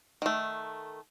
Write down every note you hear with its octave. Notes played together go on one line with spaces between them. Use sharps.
D#3 A3